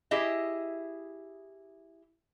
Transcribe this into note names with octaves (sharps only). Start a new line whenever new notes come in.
E4 G4 G#4 D#5 E5